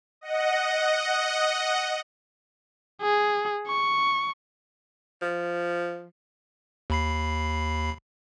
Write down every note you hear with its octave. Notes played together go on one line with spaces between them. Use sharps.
D#5 F#5
G#4
C#6
F3
D#2 B5 C7